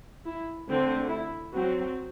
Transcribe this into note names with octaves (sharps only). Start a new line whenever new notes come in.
E4
D3 A3 C4
E4
F#3 C4 F#4